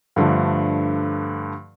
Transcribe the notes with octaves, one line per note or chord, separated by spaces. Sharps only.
G2 D3 F3 A3